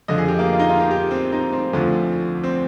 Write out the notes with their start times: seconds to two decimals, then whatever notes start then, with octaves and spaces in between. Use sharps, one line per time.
0.08 F2 D3 F3 D#5
0.18 G#4
0.28 G4
0.39 A#3
0.54 F4
0.59 D#4
0.69 F4
0.81 G4
0.91 G4
1.11 C4
1.32 D#4
1.53 C4
1.73 D2 D3 F3
2.44 C4